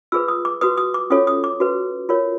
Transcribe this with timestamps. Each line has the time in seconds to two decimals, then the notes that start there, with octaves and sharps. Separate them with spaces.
0.12 F4 G#4 B4 E6
0.28 D#6
0.45 D6
0.61 F#4 B4 D#6
0.78 D#6
0.94 D6
1.10 C#4 F4 A4 C#5 D#6
1.27 D#6
1.44 D6
1.60 F#4 B4
2.09 F4 A#4 C#5